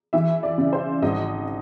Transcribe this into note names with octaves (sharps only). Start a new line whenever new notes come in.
E3 E5
D5
C#3
C5
G#1 D#5